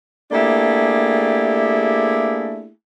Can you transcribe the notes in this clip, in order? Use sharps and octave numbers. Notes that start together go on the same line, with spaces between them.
A3 A#3 D4 E4 G4 G#4